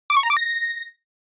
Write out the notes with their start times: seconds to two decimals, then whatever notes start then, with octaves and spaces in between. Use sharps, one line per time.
0.10 D6
0.17 C#6
0.23 A#5
0.30 D6
0.37 A#6